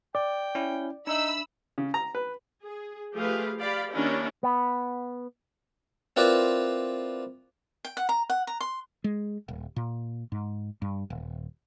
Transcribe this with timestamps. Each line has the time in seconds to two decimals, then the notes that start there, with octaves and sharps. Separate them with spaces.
0.15 D5 G5
0.55 C#4 E4
1.07 D4 D#4 E5 B5 E6
1.78 C#3
1.94 A#5
2.15 B4
2.62 G#4
3.14 F3 A3 G4 G#4 B4 F5
3.59 G4 D5 F5 B5
3.91 D#3 A#3 C#4 D4 E4 G4
4.43 B3
6.16 C4 E4 F4 A#4 B4 D5
7.85 G5
7.97 F#5
8.09 A#5
8.30 F#5
8.47 A#5
8.61 C6
9.04 G#3
9.48 D#1
9.76 A#2
10.32 G#2
10.82 G2
11.10 D#1